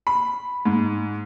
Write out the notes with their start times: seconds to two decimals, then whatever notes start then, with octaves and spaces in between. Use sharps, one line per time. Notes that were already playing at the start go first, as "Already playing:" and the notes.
0.07 B5
0.65 G#2